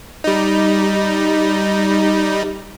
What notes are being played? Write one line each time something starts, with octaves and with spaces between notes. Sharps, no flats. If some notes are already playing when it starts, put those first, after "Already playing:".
G3 D#4